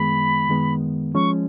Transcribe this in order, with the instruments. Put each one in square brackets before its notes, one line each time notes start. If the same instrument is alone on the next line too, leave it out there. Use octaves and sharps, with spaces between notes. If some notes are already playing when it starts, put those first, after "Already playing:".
Already playing: [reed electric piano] F#2 D#3 G#3 B3 [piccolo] B5
[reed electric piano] F#2 D#3 G#3 B3
[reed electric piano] F3 G#3 C#4 [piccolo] C#6